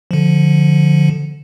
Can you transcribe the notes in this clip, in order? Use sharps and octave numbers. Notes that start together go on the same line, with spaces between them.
D3 F3